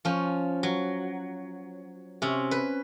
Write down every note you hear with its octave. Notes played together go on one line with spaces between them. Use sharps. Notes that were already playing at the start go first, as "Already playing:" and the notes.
F3 C#4
F#3
C3 C#4
B4